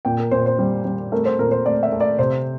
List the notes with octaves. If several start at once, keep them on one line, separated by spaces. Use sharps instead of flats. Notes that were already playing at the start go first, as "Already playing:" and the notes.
A#2 G5
A#4
A#2 C5
C5
G3
G3
A3 A#4
C5
A#2 A#4
C5
A3 D5
E5
A3
D5
C3 C5